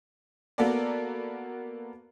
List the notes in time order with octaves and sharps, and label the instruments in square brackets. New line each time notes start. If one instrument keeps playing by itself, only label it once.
[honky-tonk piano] A#3 B3 F#4 A4 A#4 D5